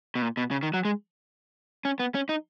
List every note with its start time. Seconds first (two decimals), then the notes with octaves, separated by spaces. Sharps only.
0.15 B2
0.22 A#2
0.37 B2
0.51 C#3
0.63 D#3
0.74 F#3
0.85 G#3
1.85 C#4
1.99 B3
2.15 C#4
2.29 D#4